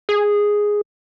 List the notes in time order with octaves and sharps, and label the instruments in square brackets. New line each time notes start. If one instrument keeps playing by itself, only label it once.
[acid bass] G#4